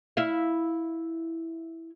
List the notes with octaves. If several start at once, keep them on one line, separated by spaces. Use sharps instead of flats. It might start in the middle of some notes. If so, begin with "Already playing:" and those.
E4 E5 F5